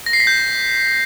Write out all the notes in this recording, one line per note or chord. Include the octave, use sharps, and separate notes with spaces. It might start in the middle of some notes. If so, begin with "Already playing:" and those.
A#6
C7
B6
G6